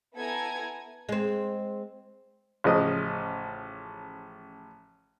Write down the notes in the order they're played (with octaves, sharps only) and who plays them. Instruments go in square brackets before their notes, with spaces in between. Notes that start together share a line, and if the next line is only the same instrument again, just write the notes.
[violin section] B3 E4 A4 G#5 A#5 G#6
[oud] G#3 C4
[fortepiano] A1 C#3 F3 D#5 D#6